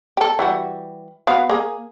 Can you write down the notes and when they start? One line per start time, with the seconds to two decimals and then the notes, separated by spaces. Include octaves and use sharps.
0.17 G4 A4
0.39 E3 G3 F#4
1.27 B3 F#4 F5
1.49 A#3 G#4